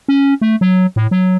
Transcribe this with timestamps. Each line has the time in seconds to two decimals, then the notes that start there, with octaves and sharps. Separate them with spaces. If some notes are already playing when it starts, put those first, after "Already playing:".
0.08 C#4
0.41 A3
0.61 F#3
0.96 A2
1.11 F#3